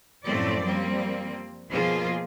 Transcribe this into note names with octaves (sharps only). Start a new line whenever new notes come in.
F#2 A2 F3 A3 C4 D5
F3 G3 A#3 C4
B2 F3 A#3 F4 G#4